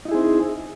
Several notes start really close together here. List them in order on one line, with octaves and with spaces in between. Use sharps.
D#4 E4 G#4 C4